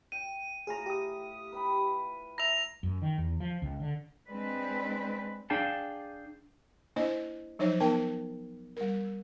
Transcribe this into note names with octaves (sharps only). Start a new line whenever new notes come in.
G5 D#7
A2 F4 G#4 A#5
G4 D#6
B4 G5 B5
E5 A#5 A#6 F7
F#2
D#3
E2
F3
C#2
D3
G#3 C4 D4 B4
D4 G#4 F5 G5 A5
A#3 D4 E4 C5 D#5
F3 F#3 D#4 C5 C#5
B3 D#4 A#4 C5 G5 A5
G3 A#4